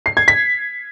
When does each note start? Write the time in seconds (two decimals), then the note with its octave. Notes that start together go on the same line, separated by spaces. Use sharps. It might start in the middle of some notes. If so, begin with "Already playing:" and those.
0.06 C7
0.17 G#6
0.28 B6